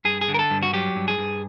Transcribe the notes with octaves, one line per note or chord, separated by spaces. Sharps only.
G2 G#4
G#4
D3
A#4
A4
G2
F#4
F#3 G4
G2
G#4
G2